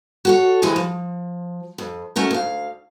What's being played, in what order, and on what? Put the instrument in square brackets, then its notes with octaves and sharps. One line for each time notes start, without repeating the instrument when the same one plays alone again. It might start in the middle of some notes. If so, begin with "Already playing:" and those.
[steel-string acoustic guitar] F#4 A4 C#5
D2 E3 G#3 G4 G#5
F3
F2
A3 C#4 F#4 A#4
D2 F5